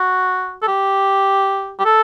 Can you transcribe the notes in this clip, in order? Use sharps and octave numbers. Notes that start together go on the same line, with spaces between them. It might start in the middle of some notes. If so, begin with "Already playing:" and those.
Already playing: F#4
A4
G4
G4
A4